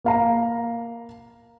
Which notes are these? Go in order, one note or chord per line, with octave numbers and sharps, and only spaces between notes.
A#3 F5 A#5